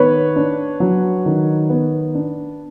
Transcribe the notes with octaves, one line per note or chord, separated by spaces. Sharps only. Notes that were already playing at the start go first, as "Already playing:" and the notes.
Already playing: D#3 B3 B4 C#5
D4
F#3
D#3
B3
D4